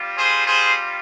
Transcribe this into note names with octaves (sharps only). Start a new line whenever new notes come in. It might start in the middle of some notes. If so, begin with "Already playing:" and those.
Already playing: G3 C4 F4
G#4 C5
G#4 C5